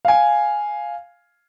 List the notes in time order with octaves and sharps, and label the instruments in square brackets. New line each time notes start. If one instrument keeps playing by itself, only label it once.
[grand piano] F5 G#5